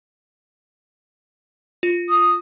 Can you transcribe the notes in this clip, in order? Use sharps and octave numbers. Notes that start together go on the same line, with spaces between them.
F4
D#6